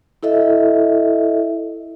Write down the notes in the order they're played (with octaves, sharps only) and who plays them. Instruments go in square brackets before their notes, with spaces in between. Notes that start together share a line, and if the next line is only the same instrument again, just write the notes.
[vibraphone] E4 A4 D#5 E5